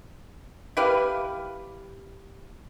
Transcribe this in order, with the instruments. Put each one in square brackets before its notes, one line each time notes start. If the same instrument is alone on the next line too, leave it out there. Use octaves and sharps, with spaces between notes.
[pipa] E4 G4 B4 F5